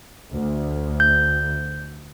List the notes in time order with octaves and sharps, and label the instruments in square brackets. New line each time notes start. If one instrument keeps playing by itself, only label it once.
[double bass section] D2
[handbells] G6